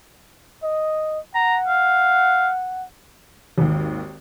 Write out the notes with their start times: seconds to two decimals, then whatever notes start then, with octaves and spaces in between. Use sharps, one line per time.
0.63 D#5
1.35 F#5 A#5
1.68 F5
3.58 G#1 D#2